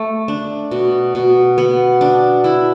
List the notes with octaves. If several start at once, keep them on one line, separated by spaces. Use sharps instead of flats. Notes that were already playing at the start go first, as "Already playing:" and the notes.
Already playing: A3
D4
B2
B2
B3
D4
E4